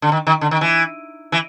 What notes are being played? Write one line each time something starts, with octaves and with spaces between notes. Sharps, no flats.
D3
D#3
D#3
D3
D#3
E3
E3